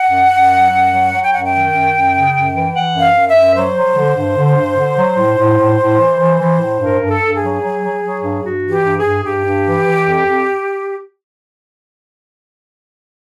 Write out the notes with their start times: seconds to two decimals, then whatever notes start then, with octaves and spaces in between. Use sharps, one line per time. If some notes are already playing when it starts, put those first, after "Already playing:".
Already playing: F#5
0.09 F#2
0.30 F#2
0.50 F#3
0.71 F#2
0.91 F#3
1.11 F#3
1.23 G5
1.31 F#2 F#5
1.44 G5
1.52 D#3
1.73 F#2
1.93 F#2
2.13 C#3
2.34 F#2
2.54 E3
2.74 E3 F#5
2.94 F#2
3.00 F5
3.15 F#2
3.28 E5
3.35 F#2
3.55 F#3 C5
3.75 F#3
3.96 D3
4.16 G2
4.37 D3
4.57 G2
4.77 D3
4.98 F#3
5.18 A2
5.38 A2
5.59 A2
5.79 A2
5.99 E3
6.19 E3
6.40 E3
6.60 A2
6.80 G2 A#4
7.01 G2
7.07 A4
7.21 G2
7.35 G#4
7.41 F#3
7.62 F#3
7.82 F#3
8.02 F#3
8.22 G2
8.43 G2 F#4
8.63 E3
8.70 G4
8.84 G2
8.97 G#4
9.04 G2
9.24 G2 G4
9.45 G2
9.65 E3
9.86 E3
10.06 F2
10.26 F2